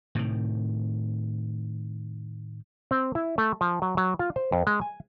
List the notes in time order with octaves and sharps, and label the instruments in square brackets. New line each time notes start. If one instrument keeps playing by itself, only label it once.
[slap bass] A2 C3 D#3
[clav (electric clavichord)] C4
E4
A3
F3
F#3
F#3
F4
C5
F2
G#3
G#5